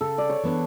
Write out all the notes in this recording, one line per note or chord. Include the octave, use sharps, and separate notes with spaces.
C#3 A4
D5
C#5
E3 B3 D4